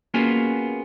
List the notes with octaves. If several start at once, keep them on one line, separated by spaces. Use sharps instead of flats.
A#3 B3 C#4 F4 F#4 G#4